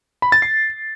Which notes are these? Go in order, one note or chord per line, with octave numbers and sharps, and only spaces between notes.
B5
A6
C7